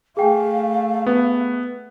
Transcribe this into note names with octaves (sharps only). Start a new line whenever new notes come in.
A3 G#4 F5 G5 G#5
B3